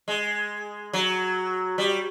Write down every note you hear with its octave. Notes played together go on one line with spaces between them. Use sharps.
G#3
F#3
G3